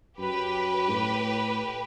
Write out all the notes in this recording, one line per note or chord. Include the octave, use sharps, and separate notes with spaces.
F#2 G4 B4
A2